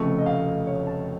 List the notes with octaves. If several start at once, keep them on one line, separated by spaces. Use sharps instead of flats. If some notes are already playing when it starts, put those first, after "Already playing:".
Already playing: F1 F2 C#3 A3 C#6
D#5
F5
C#5
A5